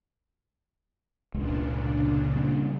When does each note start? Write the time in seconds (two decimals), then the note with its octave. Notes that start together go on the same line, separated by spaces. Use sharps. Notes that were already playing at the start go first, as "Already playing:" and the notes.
1.34 F1 C#2 A#2 C#3 G#3 D4
2.35 G3 C4 C#4